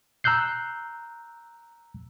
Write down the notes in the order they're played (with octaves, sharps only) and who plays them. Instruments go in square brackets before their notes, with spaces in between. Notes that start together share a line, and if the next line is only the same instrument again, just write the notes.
[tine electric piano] A#5 E6 F#6 G6 C7